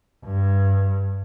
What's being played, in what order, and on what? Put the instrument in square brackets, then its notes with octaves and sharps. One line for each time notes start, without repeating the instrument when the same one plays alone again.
[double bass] G2